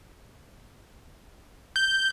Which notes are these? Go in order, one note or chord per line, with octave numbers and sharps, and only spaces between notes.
G6